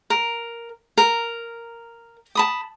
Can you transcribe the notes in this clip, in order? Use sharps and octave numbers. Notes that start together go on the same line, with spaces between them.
A#4
A#4
A5 B5 D#6